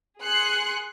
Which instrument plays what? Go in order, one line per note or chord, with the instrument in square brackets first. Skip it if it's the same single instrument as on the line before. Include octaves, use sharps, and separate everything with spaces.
[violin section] G#4 C6 F#6 C7 C#7